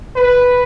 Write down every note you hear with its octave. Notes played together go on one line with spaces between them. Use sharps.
B4